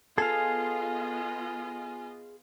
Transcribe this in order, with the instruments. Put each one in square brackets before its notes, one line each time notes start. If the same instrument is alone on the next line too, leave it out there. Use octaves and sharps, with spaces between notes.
[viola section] B3 F4 D#5 [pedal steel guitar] G#4 F5 [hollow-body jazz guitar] A4 [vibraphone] G#5